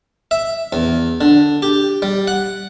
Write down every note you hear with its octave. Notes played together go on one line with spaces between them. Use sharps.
E5
E2
D3
G4
G3
F#5